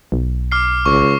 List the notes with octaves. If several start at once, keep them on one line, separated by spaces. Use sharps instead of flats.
B1
D6 F6 C7
C#2 C#6